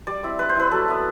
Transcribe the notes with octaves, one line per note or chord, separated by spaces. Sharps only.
G3 D5
C4 E4
G3 B4
C5
C4 E4 B4
F#3 A4
B3 E4